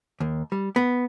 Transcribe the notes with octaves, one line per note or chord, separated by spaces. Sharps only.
D#2
G3
B3